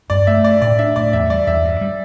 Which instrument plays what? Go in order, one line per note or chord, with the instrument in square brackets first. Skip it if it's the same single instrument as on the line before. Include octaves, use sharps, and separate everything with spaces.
[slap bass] G2 [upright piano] D5
[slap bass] A3 [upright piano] E5
[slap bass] G2 [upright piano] D5
[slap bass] A2 [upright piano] D5
[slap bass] D4 [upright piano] E5
[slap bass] A2 [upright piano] D5
[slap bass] E2 [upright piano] E5
[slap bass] G3 [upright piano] D5
[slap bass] E2 [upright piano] E5
[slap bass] G2
G3